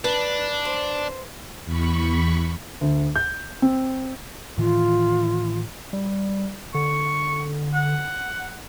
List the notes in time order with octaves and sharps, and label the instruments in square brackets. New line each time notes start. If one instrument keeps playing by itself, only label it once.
[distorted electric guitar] D4 [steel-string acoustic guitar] B4
[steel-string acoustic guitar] C5
[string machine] E2 B5 C#6
[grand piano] D2
G6
C4
[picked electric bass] A2 D#3 E3 [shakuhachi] F4
[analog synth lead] G3
[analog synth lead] D3 [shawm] C#6
[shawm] F#5